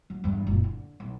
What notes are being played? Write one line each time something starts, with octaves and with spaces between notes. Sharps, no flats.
F#3
E2 G2
F#1 A#2
D3
B1